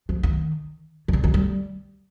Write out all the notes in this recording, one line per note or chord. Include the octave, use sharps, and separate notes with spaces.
F3
D#3
D#3
D3
D#3
G3